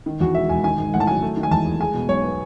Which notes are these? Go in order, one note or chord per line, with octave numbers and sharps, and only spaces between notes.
D#3
E2 F#4
E1 E5
E1 G#5
D#3 G#5
G#2
A1 F#5
A5
F#3 G#5
A3
D#3
G#5
E2 A5
E2
G#3 G#5
B2
B1 C#5
B3